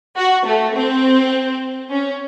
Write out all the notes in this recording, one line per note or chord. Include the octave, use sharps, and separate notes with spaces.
F#4
A3
C4
C#4